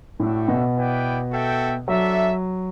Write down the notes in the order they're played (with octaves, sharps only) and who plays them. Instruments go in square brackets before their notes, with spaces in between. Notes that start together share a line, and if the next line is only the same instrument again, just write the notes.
[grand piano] A2 [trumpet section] D4 F#4 A4 E5 G5
[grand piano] B2
[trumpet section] B3 E4 B4 D5 G5
F#4 A4 E5 G5
[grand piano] F#3 [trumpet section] D4 A4 E5